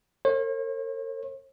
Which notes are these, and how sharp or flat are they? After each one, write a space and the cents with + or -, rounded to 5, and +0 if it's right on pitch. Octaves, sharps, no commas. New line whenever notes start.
A#4 -40 C#5 -45